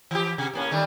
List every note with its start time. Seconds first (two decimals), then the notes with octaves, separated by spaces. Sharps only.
0.11 E3 G4
0.38 C3
0.53 A2 A#3 C#4
0.71 D#3 G3 A3